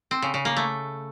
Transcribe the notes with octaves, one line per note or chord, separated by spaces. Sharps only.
C4
C#3
C#3
A#3
A3